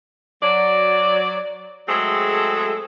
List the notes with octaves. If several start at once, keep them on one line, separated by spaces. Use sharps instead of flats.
F#3 D5
F#3 G#3 A3 C4 G#4 A4